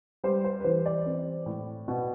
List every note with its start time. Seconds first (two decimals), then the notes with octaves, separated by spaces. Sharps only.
0.24 G3 C5
0.44 C5
0.60 B4
0.64 E3 C5
0.86 D5
1.05 C4
1.46 A2
1.88 B2